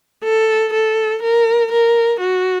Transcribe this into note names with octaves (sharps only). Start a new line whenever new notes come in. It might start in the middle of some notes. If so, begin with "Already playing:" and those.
A4
A4
A#4
A#4
F#4